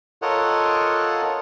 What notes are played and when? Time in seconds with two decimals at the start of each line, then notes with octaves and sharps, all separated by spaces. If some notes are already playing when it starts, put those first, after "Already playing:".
0.22 F4 A4 A#4 C#5 D#5 F#5